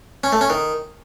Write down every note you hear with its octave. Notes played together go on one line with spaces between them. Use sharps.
C#4
A3
C#4
D#3